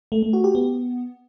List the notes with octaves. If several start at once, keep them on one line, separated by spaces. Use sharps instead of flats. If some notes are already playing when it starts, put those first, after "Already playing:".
A3
A3
F#4
G4
B3